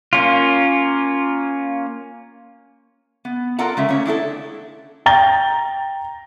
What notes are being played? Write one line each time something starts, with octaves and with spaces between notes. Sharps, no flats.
A#3 C#4 F4
B3
F4 A4 A#4 D5 F#5 A#5
C#3 G#3 E5
A3 A#3 C#4 C#5
D4 E4 F#4 A4
G5 A#5 A6 G7